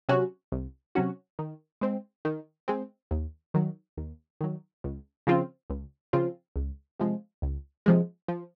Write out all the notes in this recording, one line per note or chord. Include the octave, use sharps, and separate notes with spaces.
C3 F#3 C#4 F#4
C2
C3 F#3 C#4 F#4
D#3
G#3 C4
D#3
G#3 C4
D#2
D#3 F#3
D#2
D#3 F#3
C#2
C#3 F3 C4 F4
C#2
C#3 F3 C4 F4
C#2
C3 F3 G#3
C#2
C3 F3 G#3
F3